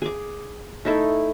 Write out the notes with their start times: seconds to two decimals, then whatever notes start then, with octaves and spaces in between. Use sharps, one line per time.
0.02 G#4 D6
0.85 A3 D#4 E4 A4